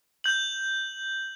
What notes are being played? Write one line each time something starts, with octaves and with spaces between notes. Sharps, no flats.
G6 F#7